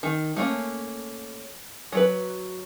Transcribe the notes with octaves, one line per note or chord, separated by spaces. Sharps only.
D#3
A3 A#3 C#4
F#3 B4